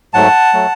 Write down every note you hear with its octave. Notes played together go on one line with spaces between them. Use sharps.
G#2 F#3 A3 F#5 A5
F#3 A3